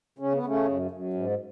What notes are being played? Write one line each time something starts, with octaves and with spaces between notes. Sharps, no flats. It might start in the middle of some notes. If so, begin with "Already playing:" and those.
C#3 C#4
B3
C#3 A3 C#4
F#2
F#2
G#2